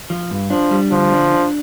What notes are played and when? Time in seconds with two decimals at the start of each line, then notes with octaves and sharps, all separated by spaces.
0.10 F3
0.31 G2
0.50 F3 D4
0.71 G3
0.91 D3 F3
1.12 D4
1.32 D4